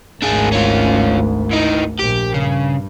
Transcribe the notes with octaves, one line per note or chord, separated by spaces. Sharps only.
G#1 D2 D4 G#4
C#4 F4
E3 D#4
A#1 G4
G2 C#3